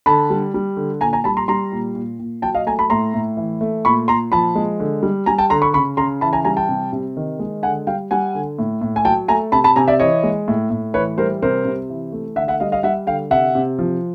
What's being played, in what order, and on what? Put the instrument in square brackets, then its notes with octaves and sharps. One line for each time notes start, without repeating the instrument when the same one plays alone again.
[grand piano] D3 A5 B5
G3
G3
D3
A#2 G#5 A#5
G#5 A#5
G3 A5 B5
A#5 C6
G3 A#5 C6
A#2
A#2
A#2
F#3 G5 A5
D#5 F5
A3 G#5 A#5
A5 B5
A2 A#5 C6
A2
E3
A3
A#2 B5 C#6
A#2 A#5 C6
F3 A5 B5
G#3
D3
G3
G3 G#5 A#5
G5 A5
D3 A#5 C6
B5 C#6
C#3 B5 C#6
C#3 A#5 C6
E3 A5 B5
G#5 A#5
G3 G#5 A#5
G5 A5
C3
C3
D#3
G#3
D3 F#5 G#5
G3 F5 G5
G3 F#5 G#5
D3
A2
A2
G#5
F#3 G5 A5
A3 G#5 A#5
C3 A5 B5
A5 B5
C3 G#5 A#5
D5 E5
E3 C#5 D#5
G#3
A2
A2
E3 B4 C#5
G3 A#4 C5
C3 A#4 C5
C3
E3
A3
D3 E5 F#5
E5 F#5
G3 D#5 F5
D#5 F5
G3 E5 F#5
D3 F5 G5
C3 E5 F#5
C3
F3